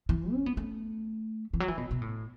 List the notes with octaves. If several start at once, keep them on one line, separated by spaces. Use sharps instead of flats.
E3
C#4
B3
A3
E3
F#3
E3
B2
B2
A2